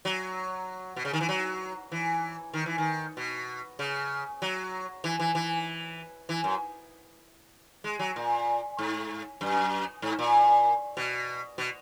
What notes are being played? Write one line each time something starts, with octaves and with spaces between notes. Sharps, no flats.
F#3
B2
C#3
D#3
E3
F#3
E3
D#3
E3
D#3
B2
C#3
F#3
E3
E3
E3
E3
F#2
G#3
F#3
A#2
G#2
F#2
G#2
A#2
B2
B2